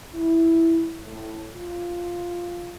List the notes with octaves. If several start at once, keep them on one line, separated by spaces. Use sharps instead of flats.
E4
A2
F4